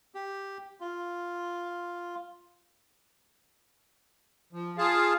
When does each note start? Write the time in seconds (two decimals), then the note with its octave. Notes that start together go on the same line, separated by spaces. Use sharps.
0.15 G4
0.81 F4
4.53 F3
4.78 F4 G#4 F5 A5